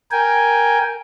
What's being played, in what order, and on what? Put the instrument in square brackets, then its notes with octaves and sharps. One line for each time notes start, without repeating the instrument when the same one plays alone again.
[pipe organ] A#4 G5 G#5